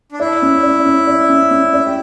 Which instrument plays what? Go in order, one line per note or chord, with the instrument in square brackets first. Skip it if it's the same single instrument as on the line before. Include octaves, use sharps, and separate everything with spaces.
[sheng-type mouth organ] D4
[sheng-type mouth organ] E4 [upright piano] D5
[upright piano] C#4
D5
C#4
D5
C#4
C#4
D5
[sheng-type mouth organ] G4